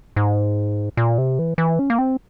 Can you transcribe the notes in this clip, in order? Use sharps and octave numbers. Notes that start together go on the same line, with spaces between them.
G#2
A#2
C3
E3
E3
C#4
A#3
C4